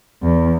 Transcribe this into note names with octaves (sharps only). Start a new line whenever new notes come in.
E2